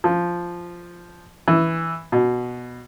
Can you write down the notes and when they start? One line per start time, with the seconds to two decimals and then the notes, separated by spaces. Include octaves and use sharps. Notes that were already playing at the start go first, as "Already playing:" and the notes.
0.04 F3
1.48 E3
2.12 B2